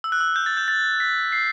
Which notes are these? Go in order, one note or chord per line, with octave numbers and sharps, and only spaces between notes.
E6
F#6
E6
G6
A6
G6
A6
B6
C7